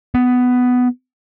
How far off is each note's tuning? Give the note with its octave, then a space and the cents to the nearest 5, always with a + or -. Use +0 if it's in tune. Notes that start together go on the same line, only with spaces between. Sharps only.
B3 +10